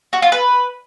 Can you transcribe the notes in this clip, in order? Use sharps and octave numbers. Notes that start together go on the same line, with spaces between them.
F#4
F4
B4